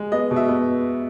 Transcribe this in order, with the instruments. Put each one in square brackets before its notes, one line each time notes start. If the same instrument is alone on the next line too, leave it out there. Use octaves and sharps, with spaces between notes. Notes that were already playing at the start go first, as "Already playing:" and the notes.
Already playing: [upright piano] G#3
B3 D#5
B2
E5
B3